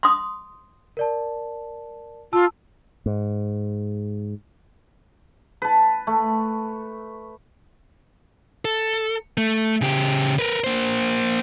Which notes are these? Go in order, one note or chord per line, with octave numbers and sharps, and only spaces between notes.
C6 D#6
A#4 D5 A5
F4 A5 E6
G#2
B4 A5
A3
A4
A3
C#3 G4
A#4 B4
A#3 C5